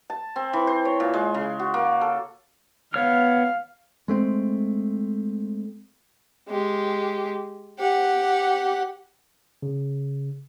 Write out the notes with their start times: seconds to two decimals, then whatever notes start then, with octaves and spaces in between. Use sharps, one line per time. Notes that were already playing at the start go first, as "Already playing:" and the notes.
0.10 A5
0.36 C4
0.53 E3
0.67 C5
0.85 C#5
1.00 A#2
1.14 G#3
1.34 C#3
1.60 F#4
1.74 A#3
2.01 A4
2.94 B3 C#5 F5 F6
4.08 G#3 A3 C4
6.49 G#3 G4
7.79 G4 F#5
9.62 C#3